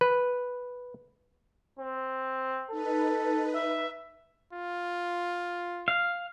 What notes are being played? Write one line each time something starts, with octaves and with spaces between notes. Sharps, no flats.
B4
C4
D#4 A4 B4
E5
F4
F5